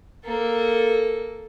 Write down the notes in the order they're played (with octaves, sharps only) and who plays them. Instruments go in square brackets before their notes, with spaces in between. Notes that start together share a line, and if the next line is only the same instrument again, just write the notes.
[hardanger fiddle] A#3 A4